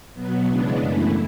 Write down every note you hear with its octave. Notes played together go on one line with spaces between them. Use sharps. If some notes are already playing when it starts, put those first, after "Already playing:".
B2 F#3 B3
C#3 E3 G#3 B3 D4
F#2 E3 A3 E4